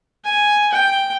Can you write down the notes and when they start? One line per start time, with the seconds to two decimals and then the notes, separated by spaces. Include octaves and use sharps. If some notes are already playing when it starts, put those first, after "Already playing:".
0.25 G#5
0.73 G5